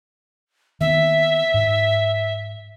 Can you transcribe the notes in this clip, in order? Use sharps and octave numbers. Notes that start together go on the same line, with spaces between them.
D#3 A#3 B3 E5
G#2